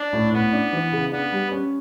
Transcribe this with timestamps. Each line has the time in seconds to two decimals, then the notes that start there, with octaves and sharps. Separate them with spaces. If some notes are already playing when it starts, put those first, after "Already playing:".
Already playing: D4
0.13 A2
0.32 A2 B3
0.53 D4
0.73 E3
0.92 C#3
1.12 B3 D4
1.32 G3
1.51 C#4